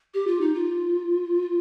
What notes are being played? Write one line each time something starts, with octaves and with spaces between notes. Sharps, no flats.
G4
F4
D#4
F4